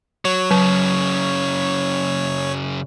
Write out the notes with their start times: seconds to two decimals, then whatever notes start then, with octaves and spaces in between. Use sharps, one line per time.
0.25 F#3 C#5
0.51 F#2 C#3 F#3